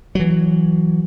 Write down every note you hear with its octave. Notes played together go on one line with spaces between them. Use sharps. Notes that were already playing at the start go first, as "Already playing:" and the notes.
E3 F#3